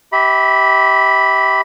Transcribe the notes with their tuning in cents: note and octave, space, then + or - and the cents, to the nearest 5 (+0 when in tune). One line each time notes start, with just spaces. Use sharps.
G4 -15 E5 -35 B5 +0